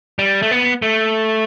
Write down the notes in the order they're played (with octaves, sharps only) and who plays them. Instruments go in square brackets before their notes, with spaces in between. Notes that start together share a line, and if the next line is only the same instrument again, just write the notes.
[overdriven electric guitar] G3
A3
B3
A3